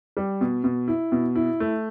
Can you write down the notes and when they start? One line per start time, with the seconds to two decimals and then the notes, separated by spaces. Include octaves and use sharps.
0.17 G3
0.41 B2
0.64 B2
0.88 E4
1.12 B2
1.35 E4
1.60 A3